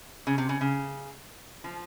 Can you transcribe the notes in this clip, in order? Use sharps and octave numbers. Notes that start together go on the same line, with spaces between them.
C#3
C3
C#3
C#3
F3